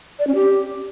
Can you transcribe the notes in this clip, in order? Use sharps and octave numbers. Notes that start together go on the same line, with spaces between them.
D5
C#4
G4